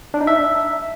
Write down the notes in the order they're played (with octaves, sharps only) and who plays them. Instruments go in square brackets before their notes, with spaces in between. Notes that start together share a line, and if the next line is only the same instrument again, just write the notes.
[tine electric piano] D4
D#4
E5